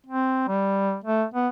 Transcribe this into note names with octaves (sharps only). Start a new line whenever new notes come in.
C4
G3
A3
B3